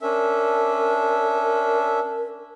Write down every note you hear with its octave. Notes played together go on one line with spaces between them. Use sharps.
C#4 D4 A#4 E5